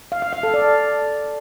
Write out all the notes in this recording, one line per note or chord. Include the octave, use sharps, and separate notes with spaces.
F5
F5
F5
A4
D5